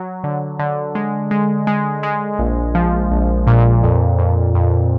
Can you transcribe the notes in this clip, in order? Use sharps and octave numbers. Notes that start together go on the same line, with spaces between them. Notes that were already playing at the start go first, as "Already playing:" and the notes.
Already playing: F#3
D3
D3
G#3
G#3
G#3
G#3
A#1
F3
A#1
A#2
F2
F2
F2